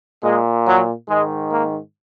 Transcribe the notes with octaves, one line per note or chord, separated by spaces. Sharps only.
A#2 G#3
F#3
G#2 D#3 G#3
A#3